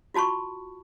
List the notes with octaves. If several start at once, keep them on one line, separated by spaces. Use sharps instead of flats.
F4 F#4 A5 B5 C#6